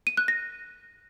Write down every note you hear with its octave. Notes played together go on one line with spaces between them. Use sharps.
D#7
F#6
A#6